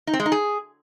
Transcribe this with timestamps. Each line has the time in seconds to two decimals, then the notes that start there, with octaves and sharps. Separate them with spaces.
0.07 D#4
0.13 C4
0.20 G#3
0.26 D#4
0.32 G#4